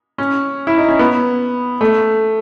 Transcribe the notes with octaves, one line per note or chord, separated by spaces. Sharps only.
C#4
E4
D#4
C#4
B3
A3